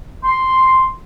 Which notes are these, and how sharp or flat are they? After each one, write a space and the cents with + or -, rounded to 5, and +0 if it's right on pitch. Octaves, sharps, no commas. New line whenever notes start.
C6 +0